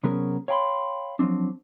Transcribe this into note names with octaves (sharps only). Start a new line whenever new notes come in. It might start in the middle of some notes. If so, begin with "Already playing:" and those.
C3 F#3 B3 C#4 G#4 A#4
C#5 F5 G5 A5 B5 C6
F3 F#3 G#3 C4 D4